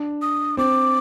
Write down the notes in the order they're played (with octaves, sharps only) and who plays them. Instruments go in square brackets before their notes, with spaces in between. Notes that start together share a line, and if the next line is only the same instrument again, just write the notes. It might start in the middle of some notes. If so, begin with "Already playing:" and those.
Already playing: [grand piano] D4
[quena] D#6
[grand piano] C4 [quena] D6